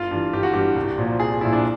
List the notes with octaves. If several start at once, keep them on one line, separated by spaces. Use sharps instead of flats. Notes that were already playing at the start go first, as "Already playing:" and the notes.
Already playing: G1 F4
G2 E3
G1 G4
F#4
G2 E3 G4
C2
A#2 F3
C2 G#4
A#2 F3 E4
D4